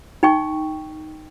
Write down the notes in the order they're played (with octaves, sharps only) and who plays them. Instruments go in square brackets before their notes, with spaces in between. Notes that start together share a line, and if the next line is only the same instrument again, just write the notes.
[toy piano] D#4 G5 C#6